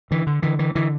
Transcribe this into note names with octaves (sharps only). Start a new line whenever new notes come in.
D3 E3
D3
D3 E3
E3
D3 E3